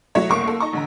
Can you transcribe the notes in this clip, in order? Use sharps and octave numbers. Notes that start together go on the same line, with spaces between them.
F#3 A3 E4 F#4 C#5 D#5
F#1 C2 A3 A#3 C#6 D7
A#3 A4
D#4 D#5 A5 A#5 C#6
A1 D3 A#5